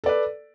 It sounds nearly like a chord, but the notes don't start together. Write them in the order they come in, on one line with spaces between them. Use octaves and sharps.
A4 D5 B4